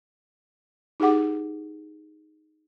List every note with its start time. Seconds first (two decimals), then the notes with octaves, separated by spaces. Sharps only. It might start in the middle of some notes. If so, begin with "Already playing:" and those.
1.00 D#4 G4 G#4 F#5 D6